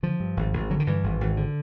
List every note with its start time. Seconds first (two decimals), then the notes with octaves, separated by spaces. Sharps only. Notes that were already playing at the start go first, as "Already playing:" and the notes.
0.03 D3 F3
0.20 G2
0.37 G#1
0.53 G#1
0.70 D3 F#3
0.80 D#3
0.87 G2 E3
1.04 G#1
1.21 G#1
1.37 D3